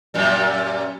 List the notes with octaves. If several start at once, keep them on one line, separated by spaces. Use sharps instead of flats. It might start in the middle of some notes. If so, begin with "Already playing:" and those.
F#2 A#2 G3